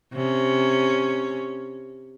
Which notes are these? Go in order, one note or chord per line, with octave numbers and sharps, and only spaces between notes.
C3 C#4